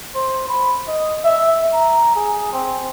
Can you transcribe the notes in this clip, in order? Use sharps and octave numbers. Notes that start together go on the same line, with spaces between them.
C5
B5
D#5
E5
A#5
G#4
C4